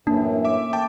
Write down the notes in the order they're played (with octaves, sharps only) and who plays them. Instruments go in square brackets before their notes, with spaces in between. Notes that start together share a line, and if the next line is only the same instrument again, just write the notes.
[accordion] F#2 A2 E3 [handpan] A#3 [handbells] D4
[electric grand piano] E5 D6
[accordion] A3 [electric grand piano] G5 A5 D6